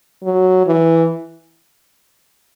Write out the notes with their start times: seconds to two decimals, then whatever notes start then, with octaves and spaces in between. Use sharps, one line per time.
0.24 F#3
0.67 E3